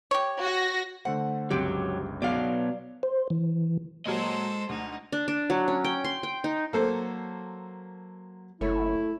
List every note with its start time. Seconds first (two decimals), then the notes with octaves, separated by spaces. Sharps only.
0.11 G4 C#5
0.41 F#4 A#6
1.05 D3 A3 C5 F#5
1.51 G1 C#2 F#3 C4 G4 D7
2.22 B2 F#3 D5 F5
3.03 C5
3.30 E3
4.06 A#2 F#3 G#3 A4 C5 D#5
4.69 D2 D#4
5.12 D4
5.28 D4
5.50 F#3
5.68 C#4
5.84 G5
6.04 C6
6.23 G5
6.44 D#4
6.73 F#3 A#3 A4 C5
8.61 F#1 A3 E4 C#5